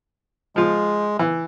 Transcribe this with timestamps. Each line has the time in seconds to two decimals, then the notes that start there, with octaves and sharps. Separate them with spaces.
0.56 F3 G#3 F4
1.19 E3